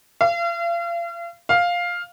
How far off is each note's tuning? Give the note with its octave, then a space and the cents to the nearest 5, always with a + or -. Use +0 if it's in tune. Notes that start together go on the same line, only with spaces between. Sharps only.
F5 -40
F5 +5